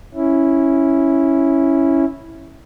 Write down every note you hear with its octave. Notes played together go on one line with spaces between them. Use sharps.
C#4 E4